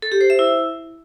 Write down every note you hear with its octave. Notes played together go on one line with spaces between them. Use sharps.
A4
G4
C5
E5
E4